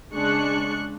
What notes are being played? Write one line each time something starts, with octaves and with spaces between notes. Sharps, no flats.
C#3 G#3 D4 C#6 F#6 C#7